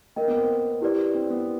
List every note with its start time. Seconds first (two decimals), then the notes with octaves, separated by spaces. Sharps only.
0.16 A#3 A#4 D#5 G5
0.28 B3
0.38 C4
0.81 E4 G4 B4 D5
1.15 C4
1.30 B3